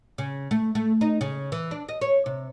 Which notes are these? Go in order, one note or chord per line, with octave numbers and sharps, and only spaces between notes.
C#3
A3
A3
D#4
C#3
E3
D4
D#5
C#5
C3